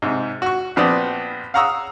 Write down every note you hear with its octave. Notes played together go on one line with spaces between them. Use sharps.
G#2 C3
F#4 C#6
A#1 F3 B3 C4 D5 D#6
F5 F#5 A#5 C#6 D#6 E6